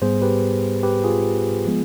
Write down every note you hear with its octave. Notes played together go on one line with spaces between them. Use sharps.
G#2 G3 B3 G#4 C5
G4 B4
G4 B4
F4 G#4
F3 G#3 B3